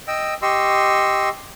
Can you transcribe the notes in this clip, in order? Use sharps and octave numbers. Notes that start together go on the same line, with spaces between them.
D#5 G5 E6
G4 D#5 C6 C#6 E6